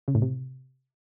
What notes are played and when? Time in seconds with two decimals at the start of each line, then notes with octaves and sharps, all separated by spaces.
0.08 C#3
0.15 A2
0.22 C3